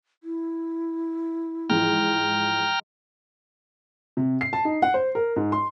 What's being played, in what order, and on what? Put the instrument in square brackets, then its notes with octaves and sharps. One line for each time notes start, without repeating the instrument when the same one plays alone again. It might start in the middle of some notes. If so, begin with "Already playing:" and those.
[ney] E4
[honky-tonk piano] G#2 E3 F3 [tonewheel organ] G5 A#5 F6
[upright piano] C3
C7
A5
D#4
F#5
C5
A#4
G#2
C6